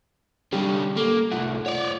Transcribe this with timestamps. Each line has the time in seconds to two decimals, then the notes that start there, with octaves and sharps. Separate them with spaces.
0.53 D3 G3 C#4 G4
0.96 A#3 A4
1.32 C2 A3 F4 F#5
1.66 C#5 D5